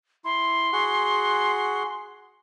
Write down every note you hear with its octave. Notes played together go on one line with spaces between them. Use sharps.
E4 C6
F#4 G#4 F#5